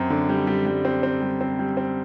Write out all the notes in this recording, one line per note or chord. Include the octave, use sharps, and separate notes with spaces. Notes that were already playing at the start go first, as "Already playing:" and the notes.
Already playing: F#2 C4
D3
G3
G3
G3
C4
C4
G3
C4
G3
C4